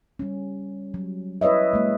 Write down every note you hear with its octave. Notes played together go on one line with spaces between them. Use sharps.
G3 C#4
F#3
E4 B4 C#5 D#5 E5
G#3 A#3